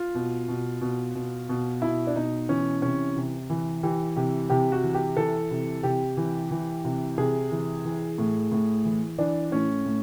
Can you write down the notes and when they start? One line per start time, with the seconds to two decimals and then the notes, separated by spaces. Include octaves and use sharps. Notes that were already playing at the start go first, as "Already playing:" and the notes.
Already playing: F4
0.15 B2
0.48 B2
0.81 B2
1.15 B2
1.49 B2
1.82 B2 E4
2.07 D4
2.15 B2 D#4
2.49 E3 C#4
2.82 C3 C#4
3.17 C3
3.50 E3
3.83 E3 G4
4.16 C3 G4
4.50 C3 G4
4.72 F#4
4.84 E3
4.94 G4
5.17 E3 A4
5.51 C3
5.83 C3 G4
6.17 E3
6.51 E3
6.85 C3
7.18 C3 G#4
7.51 E3
7.85 E3
8.18 A2
8.52 A2
8.85 E3
9.18 E3 D4
9.51 A2 C#4
9.85 A2